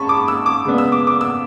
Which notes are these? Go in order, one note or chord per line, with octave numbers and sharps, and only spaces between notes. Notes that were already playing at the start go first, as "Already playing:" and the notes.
Already playing: G#2 G#3 C#4 A5 B5 C#6
D6
E6
D6
C#3 G#3 B3 D4
E6
D6
D6
E6